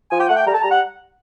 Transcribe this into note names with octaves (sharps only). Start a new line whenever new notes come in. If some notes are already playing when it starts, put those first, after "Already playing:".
F3 G#5
G5
A3 F#5
G5
G3 A#5
A5
G3 A#5
F#5